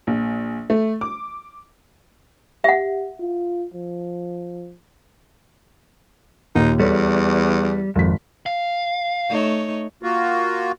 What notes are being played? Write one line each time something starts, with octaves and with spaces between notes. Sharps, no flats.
A#1
A3
D6
G4 E5 F#5
F4
F3
D#2 A#2 D#4
E2 G3 A4 C#5
G#1 F2 B6
F5
A3 D#4 C#5
A#3 F4 F#4